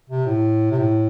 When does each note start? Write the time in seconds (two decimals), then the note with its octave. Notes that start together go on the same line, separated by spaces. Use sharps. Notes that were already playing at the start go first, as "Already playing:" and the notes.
0.10 C3
0.26 A2
0.71 C3
0.79 A2